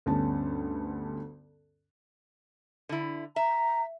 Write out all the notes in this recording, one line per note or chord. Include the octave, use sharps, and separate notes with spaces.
D2 G2 B3 C#4 A5
D3 E4
E5 A#5